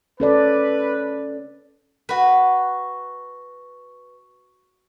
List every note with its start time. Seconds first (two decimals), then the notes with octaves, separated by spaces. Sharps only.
0.20 C#4 A4 B4 D5
2.09 F#4 B4